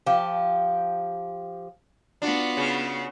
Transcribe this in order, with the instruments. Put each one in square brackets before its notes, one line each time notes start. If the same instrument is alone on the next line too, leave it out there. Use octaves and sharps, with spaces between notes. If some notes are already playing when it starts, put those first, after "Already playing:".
[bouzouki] F3 G4
[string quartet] B3 F4 F#4 [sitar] D4
[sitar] C#3